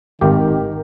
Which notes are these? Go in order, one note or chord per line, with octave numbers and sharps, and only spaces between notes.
G#1 D#3 G4 A#4